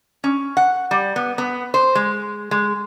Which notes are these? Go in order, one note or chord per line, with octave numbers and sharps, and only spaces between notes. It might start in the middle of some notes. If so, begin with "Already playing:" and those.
C#4
F#5
G3
B3
B3
C5
G#3
G#3